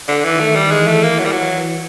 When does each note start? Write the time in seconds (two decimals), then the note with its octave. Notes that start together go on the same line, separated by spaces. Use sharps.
0.08 D3
0.25 D#3 E3
0.40 A3
0.56 G3
0.71 E3 G#3
0.87 A3
1.03 A#3
1.18 E3 F#3
1.25 G3
1.32 F#3